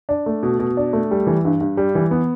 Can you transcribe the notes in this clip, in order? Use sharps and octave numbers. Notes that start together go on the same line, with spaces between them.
D4
A3
B2
B2
D4
A3
G3
E3
G2
G2
G3
E3
B3